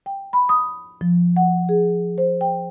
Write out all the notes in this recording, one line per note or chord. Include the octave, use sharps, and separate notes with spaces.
G5
B5
D#6
F3
F#5
G#4
C5
G5